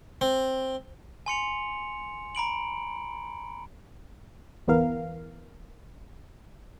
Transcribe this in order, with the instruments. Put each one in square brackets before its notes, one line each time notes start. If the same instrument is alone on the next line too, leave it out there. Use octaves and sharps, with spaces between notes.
[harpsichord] C4
[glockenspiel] G#5 C6 C#7 F7
A#5 B5 D7 F#7
[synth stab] G1 E2 E3 B3 A#4 F5